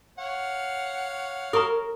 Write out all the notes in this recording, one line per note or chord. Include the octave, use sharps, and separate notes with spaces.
C#5 F5 F#5
A#4 A#5 C#6 D#6